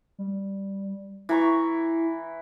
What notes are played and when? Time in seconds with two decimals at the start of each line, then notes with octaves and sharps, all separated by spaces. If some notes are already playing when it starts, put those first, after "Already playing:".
0.19 G3
1.29 E3 E4 A#5 C#6